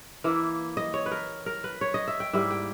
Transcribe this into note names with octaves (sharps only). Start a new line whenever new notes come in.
E3 A#3 E4
D#5
C#5
B4
A#4
A#4
B4
C#5
D#5
E5
G5
G#2 G3 A#3 E4 E5
G5